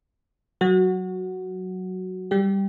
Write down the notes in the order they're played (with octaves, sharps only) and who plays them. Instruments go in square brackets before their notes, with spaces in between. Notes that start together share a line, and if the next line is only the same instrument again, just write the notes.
[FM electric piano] F#3 F#4
G3 G4